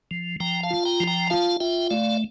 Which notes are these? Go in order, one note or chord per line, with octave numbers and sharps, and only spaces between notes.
F3
F3 G5 A#5
F5 A5
F4
G5 A#5
F3
G5 A#5
F4 F5 A5
F4 E5 G5
A3 D5 F5